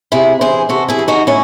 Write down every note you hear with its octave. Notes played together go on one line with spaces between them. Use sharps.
C3 E4 G#4
E3 G#4 C5
C3 F#4 A4
E4 G#4
E3
D#4 F#4
A2 C#4 E4